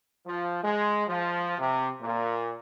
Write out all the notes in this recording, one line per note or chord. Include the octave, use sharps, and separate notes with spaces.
F3
G#3
F3
C3
A#2